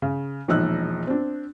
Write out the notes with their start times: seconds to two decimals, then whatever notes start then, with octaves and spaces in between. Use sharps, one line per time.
0.02 C#3
0.48 E1 A#1 D#4 E6 F#6
1.07 C4 D4